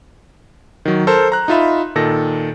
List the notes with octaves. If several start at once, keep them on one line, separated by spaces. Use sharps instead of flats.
D#3 F#3
A4 A#4 C5
A#5 F#6
D#4 F4 E5 B5
A#2 D#3 A4 A#6